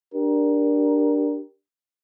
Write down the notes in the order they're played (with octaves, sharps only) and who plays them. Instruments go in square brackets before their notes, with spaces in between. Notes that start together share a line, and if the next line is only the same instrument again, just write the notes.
[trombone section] D4 G4 A#4